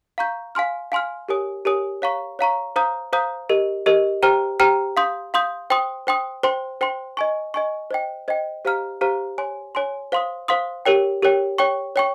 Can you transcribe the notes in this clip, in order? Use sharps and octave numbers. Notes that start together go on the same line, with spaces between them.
F5 A#5 C#6 G6
F5 G#5 C6 F6
F5 G#5 C6 F6
G4 A#4 C#5 G#5 D#6
G4 A#4 C#5 G#5 D#6
C#5 F5 A#5 C#6
C#5 F5 A#5 C#6
C5 F5 A#5 D#6 G6
C5 F5 A#5 D#6 G6
G4 A#4 D#5
G4 A#4 D#5
G4 C5 G5 A#5 F6
G4 C5 G5 A#5 F6
F5 C6 D#6 G6
F5 C6 D#6 G6
C5 G5 C6 D#6
C5 G5 C6 D#6
C5 G5 C6
C5 G5 C6
D#5 G#5 C#6
D#5 G#5 C#6
C5 D#5 G5
C5 D#5 G5
G4 C5 F5 A#5 F6
G4 C5 F5 A#5 F6
C#5 G#5 C6
C#5 G#5 C6
C5 F5 C6 D#6
C5 F5 C6 D#6
G4 A#4 C#5 G5
G4 A#4 C#5 G5
C#5 G5 C#6
C#5 G5 C#6